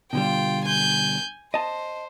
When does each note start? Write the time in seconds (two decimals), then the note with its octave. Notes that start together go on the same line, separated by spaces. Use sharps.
0.13 B2 D3 G3 F4 G5
0.65 G#5 G6
1.54 C5 D#5 A5